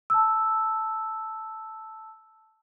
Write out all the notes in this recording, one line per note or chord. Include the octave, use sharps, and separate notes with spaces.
A5 E6